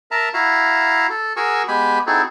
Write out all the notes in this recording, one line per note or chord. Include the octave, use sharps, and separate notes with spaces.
A#4 E5 A5 A#5
E4 F#4 E5 F5 A#5
A4
F#4 G#4 A#4 G#5 C#6 E6
G#3 B3 G4 G#5 B5
C4 D#4 E4 F#4 G#4 A4